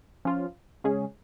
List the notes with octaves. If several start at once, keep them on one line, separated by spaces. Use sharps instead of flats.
F3 C#4 F4
C#3 G#3 C#4 G#4